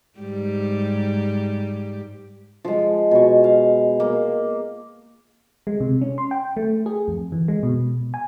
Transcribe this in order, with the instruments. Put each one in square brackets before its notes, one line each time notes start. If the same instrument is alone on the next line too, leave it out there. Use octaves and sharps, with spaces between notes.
[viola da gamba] G#2 G3 G4
[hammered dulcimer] F3 G#3
B2 C#6
F5
A#3
[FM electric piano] G#3
C3
C#4
C6
G5
A3
G#4
F2
E3
G#3
B2
G#5